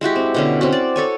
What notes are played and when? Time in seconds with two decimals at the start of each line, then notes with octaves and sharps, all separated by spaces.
0.01 G#3 E4 F#4 G4
0.16 C4
0.34 B2 D3 C#4
0.61 C4 C#4 F#4
0.72 D5
0.96 A4 C#5 G#5